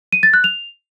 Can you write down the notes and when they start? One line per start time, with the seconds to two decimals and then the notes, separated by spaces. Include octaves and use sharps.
0.13 D#7
0.23 A6
0.34 F#6
0.44 F7